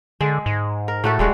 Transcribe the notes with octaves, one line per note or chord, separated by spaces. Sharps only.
D3 G#3
G#2
A#4
A2 A3 F#4 A4
D#1 G3 G#3 F#4